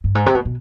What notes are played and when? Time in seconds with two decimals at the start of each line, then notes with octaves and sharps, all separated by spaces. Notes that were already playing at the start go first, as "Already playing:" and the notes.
0.04 G2
0.15 G#2
0.26 C3
0.35 B2
0.45 B2